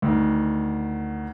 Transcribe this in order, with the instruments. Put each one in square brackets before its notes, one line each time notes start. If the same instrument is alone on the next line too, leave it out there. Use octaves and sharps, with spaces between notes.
[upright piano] D2 D#3